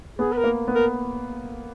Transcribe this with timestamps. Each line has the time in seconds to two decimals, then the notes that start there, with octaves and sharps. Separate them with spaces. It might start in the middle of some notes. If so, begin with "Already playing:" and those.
0.19 B3 G#4
0.33 B4
0.37 A#4
0.44 A#3
0.68 B3
0.74 A#4